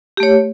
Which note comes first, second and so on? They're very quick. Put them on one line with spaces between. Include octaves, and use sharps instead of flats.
G4 A3 C#5